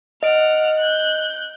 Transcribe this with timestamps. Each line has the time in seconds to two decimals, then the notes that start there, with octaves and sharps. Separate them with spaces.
0.23 D#5 F#5 F6 D7
0.79 F#6 G6